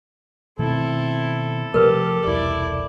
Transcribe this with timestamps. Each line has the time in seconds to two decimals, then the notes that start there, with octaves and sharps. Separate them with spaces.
0.59 B2 D#3 A3 C4 E4 A4
1.74 C3 F3 A3 G4 A#4 B4
2.25 E1 C2 E4 D5